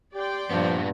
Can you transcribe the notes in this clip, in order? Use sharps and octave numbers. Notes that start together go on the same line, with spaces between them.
G4 D5 G5 C6
G2 A#2 F3 B3